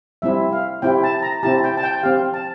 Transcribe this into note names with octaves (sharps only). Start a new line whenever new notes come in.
G3 C4 E4 E5
F5
C4 E4 G4 G5
A5
A#5
C4 E4 G4 A5
G5
A5
G5
C4 G4 F5
A5